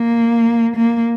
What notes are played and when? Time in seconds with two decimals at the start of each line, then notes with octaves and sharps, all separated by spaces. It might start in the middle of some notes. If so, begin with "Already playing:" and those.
Already playing: A#3
0.76 A#3